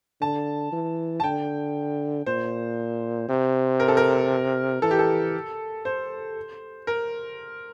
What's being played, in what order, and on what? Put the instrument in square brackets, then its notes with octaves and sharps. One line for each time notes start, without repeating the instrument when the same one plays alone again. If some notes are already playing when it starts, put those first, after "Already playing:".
[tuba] D3 [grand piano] A5
[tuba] E3
[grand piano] A5
[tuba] D3 [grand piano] G5
[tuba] A#2 [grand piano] C5
[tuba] C3
[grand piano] A#4
A4
A#4
[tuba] E3 [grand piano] A4
[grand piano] G4
A4
C5
A#4